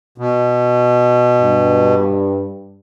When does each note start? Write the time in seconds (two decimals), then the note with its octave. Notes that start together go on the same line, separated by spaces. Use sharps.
0.18 B2
1.41 G2